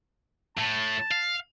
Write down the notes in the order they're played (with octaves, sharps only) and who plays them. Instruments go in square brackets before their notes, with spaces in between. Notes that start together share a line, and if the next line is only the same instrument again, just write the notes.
[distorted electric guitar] A2 [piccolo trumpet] A5
[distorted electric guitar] F5